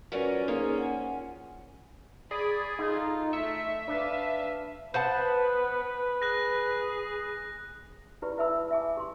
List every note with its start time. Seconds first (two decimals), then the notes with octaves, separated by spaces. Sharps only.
0.12 F#3 C#4 F4 A#4 B4 D5
0.48 A#3 D#4 F4 G#4 C5
0.78 F#5 G#5
2.31 G#4 D5 B5
2.79 D#4 F4 A4
3.33 A3 E5 C#7
3.88 D4 B4 F5
4.94 B3 B4 C5 F#5 A5
6.22 G#4 F#6 A#6
8.22 E4 G4 B4 D5 B5
8.37 E4 B4 E5 A5 B5 E6
8.71 E5 G#5 D6
8.97 G4 C6